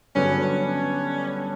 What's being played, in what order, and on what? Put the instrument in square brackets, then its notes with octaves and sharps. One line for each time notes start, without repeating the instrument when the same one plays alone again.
[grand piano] G2 D3 F#3 B3 [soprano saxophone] C#4
[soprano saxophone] C#4